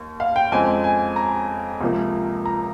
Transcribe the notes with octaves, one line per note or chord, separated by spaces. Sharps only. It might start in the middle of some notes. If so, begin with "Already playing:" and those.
Already playing: D#2
F5
G5
F2 C#3 G#3 C4 G#5
G#5
A#5
C#2 C3 F3 A#3
A#5